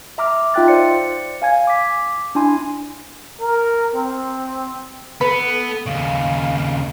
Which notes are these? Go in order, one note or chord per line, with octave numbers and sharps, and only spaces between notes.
E5 A#5 D6 F6
D#4 F4 E5 G5 F#6 A6
C5 D5 C#7
F5 G#5 G#6
D6 B6
D4 E4 G#5 C6
A#4
C4
B3 A4 B4
D#2 C#3 F5